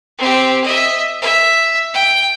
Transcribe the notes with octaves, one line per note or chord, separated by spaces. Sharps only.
C4 G4
D#5 E5
E5
G5